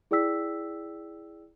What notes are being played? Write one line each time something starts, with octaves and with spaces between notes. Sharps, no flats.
E4 G#4 D5 G5 E6 B6